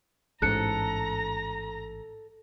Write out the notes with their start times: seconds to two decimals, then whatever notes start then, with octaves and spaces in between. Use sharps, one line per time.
0.42 A1 G#2 A4 A#5 F#6 C#7